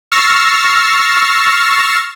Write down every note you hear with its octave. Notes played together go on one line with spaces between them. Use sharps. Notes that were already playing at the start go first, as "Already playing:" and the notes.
C#6 E6 F6 A6 A#6 C7